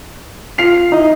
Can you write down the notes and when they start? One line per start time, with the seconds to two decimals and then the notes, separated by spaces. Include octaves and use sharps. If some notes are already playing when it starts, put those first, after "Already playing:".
0.58 F4 C7 F7
0.92 D#4 E4 D#5